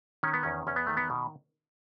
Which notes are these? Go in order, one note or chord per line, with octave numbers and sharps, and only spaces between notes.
D#3 C#4
B3
E2 C#4
E2 C#4
B3
D#3 A3
B3
B2